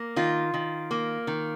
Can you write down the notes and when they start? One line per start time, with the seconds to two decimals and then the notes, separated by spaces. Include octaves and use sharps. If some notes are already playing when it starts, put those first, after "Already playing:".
Already playing: A#3
0.16 D#3 F4
0.54 D#3
0.91 A#3
1.27 D#3